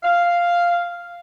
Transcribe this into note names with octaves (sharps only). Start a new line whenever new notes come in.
F5